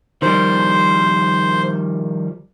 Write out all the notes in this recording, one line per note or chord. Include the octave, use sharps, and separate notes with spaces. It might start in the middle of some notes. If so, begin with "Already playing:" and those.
D#3 F3 G3 C5